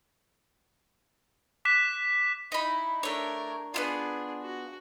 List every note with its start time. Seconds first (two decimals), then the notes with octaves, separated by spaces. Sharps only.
1.65 D6 F#6 B6 E7
2.52 D#4 E4 B5
3.03 A3 D4 A#4 C#5
3.74 B3 D4 E4 F4 G#4
4.42 F#4